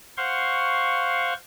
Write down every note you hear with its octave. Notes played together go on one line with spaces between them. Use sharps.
C5 F5 F#5 C6 C#6